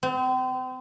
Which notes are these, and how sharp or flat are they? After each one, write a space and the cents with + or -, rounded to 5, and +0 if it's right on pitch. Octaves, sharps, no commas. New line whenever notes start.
C4 -35